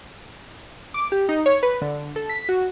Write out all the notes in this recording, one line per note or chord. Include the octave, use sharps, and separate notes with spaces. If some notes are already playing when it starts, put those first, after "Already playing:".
D6
G4
D#4
C#5
B4
D3
A4
B6
F#4